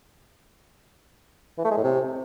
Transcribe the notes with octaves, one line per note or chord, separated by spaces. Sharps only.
E3
A3
G#3
A2
C3